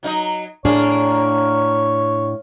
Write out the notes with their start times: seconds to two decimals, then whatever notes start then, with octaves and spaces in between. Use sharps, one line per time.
0.03 F#3 D#4 D#5
0.65 A2 A#3 D4 G#4 C#5